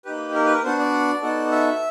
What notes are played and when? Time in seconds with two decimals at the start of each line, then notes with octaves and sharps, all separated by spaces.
0.05 A#3 D#4 G4 B4
0.34 A#4
0.45 B4
0.53 A#4
0.64 B3 D4 F#4 C5
0.79 D5
1.22 B3 D#4 F#4 A4
1.52 E5